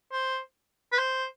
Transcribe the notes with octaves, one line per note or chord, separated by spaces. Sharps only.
C5
B4
C5